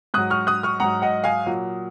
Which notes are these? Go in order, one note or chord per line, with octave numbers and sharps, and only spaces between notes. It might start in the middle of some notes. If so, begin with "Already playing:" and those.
G#2 F#3 D#6 F#6
C#6 F6
D#6 F#6
C#6 F6
G#2 F#3 F#5 A#5
D#5 F#5
F5 G#5
A#2 F#3